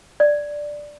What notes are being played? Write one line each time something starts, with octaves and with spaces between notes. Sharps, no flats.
D5